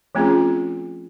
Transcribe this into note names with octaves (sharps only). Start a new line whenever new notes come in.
F3 A3 C4 C#4 F4 G#4